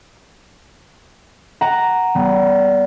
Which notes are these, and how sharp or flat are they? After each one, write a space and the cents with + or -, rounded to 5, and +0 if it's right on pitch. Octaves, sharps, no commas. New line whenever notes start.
F#5 +0 A#5 +0
G3 -30 B3 +0